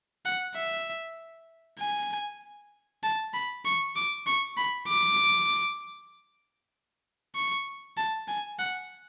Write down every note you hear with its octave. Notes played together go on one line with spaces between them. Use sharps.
F#5
E5
G#5
A5
B5
C#6
D6
C#6
B5
D6
C#6
A5
G#5
F#5